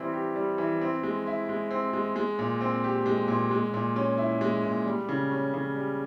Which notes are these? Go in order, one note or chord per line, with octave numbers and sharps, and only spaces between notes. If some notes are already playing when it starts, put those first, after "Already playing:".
Already playing: E3 G3 C4
G4
G3
E3
C4
G#3
E4
G#3
C4
G#3
G#3
A#2
C4
G4
G#3
A#2
G#3
A#2
C#4
E4
G#3
A#2
G3
C#3
C#4
C#3
G3